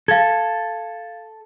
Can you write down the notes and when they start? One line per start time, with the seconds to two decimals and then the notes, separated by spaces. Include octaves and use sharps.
0.08 A4 F5 G#6